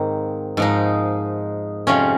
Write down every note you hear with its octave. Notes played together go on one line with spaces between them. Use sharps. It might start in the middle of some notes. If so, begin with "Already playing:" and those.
Already playing: G#2 D#3 A#3 C4
G#2 F3 D#4
F2 C3 F3 C#4